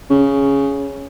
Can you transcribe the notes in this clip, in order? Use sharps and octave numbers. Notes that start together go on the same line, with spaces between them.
C#3